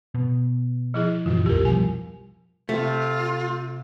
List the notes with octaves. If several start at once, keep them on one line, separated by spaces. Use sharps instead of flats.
B2
F3 E4 G#4
F#2 A#2 E3 F4 F#4
B1 F2 G4 A#4
B2 F3 G3 G#5
C3 A3 F4